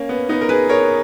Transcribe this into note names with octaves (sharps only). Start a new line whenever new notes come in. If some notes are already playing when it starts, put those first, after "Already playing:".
Already playing: A#3 C#4
B3
B3 D#4
A#4
G#4 B4
A#4 C#5